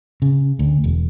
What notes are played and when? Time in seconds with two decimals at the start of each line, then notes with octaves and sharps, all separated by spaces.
0.22 C#3
0.59 D2
0.84 E1